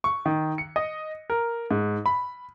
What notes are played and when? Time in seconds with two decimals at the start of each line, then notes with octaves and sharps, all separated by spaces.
0.04 C#6
0.26 D#3
0.58 C#7
0.76 D#5
1.30 A#4
1.71 G#2
2.06 B5